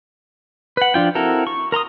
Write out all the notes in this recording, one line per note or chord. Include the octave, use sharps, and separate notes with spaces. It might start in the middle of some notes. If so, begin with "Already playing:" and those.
B4 F#5
F3 D4 F4 G5
C4 E4 F#4 A4 A#4
C#6
A#4 A#5 C6 D#6